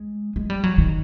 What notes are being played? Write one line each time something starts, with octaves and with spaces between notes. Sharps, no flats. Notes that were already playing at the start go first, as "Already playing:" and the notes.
Already playing: G#3
G#3
G3
F#3
D#3